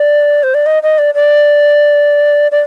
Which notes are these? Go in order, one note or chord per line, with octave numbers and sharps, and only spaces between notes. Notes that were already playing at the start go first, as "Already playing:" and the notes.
Already playing: D5
C5
D5
D#5
D#5
D5
D5
D5